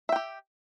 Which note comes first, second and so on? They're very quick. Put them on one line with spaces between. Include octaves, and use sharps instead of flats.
E5 G5 G4